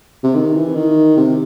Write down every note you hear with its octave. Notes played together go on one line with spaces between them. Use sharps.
C3
D#3
E3
D#3
C3